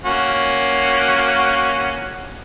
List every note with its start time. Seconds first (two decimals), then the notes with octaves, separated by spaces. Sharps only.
0.05 A#3 C#4 F#4